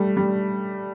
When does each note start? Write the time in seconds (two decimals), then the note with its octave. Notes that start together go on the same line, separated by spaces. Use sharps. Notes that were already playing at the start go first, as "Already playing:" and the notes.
Already playing: G3 A3
0.17 G3